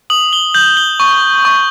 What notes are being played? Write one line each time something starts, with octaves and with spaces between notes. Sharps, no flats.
D#6 F#7
G7
G6 F#7
G7
C#6
C#6